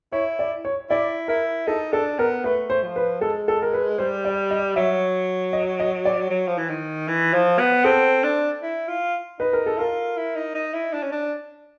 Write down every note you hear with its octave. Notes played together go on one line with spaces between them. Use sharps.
E4 C#5
D5
C#5
E4 D5
E4 A#4
D#4 A4
D4 A4
B3 A#4
A3 B4
C5
F3
B4
G#3 A4
A4
A#4
B4
G3 C5
D5
D#5
F#3 E5
D#5
D#5
D5
F#3
F3
E3
D#3
E3
F3
B3
C4 A4
D4
E4
F4
D#4 B4
A#4
A4
F4 A#4
E4
D#4
D#4
E4
D4
C#4
D4